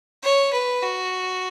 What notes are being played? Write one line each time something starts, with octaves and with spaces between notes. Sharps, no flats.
C#5
B4
F#4